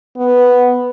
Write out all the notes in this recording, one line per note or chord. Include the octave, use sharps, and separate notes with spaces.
B3